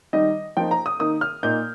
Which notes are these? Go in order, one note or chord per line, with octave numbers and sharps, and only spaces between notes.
D#3 G3 D#4 D#5
F3 A#3 D#4 G5
A#5
D#6
D#3 A#3 D#4 D#6
F6
A#2 A#3 D#4 G6